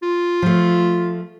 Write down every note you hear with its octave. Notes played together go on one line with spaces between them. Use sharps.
F4
F3 A3